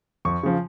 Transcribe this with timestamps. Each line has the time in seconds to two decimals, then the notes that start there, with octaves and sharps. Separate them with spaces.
0.25 F2 C#6
0.43 C#3 F3